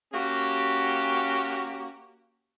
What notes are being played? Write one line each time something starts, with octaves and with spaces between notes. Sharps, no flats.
A#3 C#4 F#4 G4